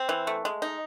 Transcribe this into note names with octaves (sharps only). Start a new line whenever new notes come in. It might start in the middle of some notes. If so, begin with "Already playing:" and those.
Already playing: C4
E3
A3
G#3
D#4